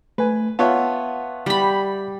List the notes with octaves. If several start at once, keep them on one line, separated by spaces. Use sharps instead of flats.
A3 B4 G#5
B3 F4 C#5 E5 F#5 A5
G3 B5